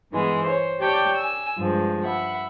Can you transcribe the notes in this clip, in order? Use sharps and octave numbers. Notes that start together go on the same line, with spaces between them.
G2 E3 G#3 B3
C5 C#5
G4 C#5 D5 G5 A5
G#5 E6
G2 F3 G#3
E5 F#5 B5